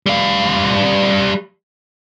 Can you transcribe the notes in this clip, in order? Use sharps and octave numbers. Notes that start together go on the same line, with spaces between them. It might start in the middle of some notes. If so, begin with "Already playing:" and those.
G3 F5